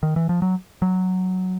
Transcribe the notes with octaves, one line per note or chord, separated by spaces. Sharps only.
D#3
E3
F3
F#3
F#3